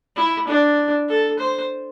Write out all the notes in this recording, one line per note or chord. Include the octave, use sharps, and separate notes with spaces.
E4
D4
A4
C5